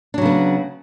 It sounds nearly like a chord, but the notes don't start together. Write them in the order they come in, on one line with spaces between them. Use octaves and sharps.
D4 F#3 C#3 B3